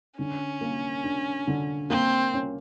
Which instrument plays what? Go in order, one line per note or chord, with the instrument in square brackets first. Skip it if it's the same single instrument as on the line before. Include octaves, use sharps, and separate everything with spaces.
[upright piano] D3 [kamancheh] C#4
[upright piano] A#3
D4
D3
[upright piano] A#3 [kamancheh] C4
[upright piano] C#4